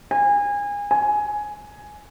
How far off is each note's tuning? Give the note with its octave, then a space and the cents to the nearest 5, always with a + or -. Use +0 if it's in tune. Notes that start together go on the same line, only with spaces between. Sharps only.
G#5 -30
G#5 +10